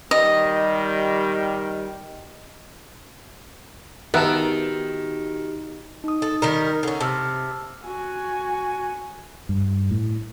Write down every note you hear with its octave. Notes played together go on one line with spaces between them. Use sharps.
D#3 G3 D#5
D#3 B3 F#4 G4 A#4 E5 A5
D#4 D#6
A4
D#3 G3 A#4
D3 C#4
C3 A5 E6 F6
F#4 G#5
G2
A2